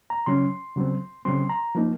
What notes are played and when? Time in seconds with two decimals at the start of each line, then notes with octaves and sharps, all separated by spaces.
0.10 A#5
0.26 C#3 F#3 C#4 C6
0.76 C#3 F#3 C4
1.25 C#3 F#3 C4 C6
1.49 A#5
1.75 F3 A#3 D#4